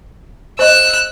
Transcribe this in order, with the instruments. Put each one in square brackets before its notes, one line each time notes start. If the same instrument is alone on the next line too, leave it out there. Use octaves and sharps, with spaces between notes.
[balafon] C5 D#5 [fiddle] E6 F#6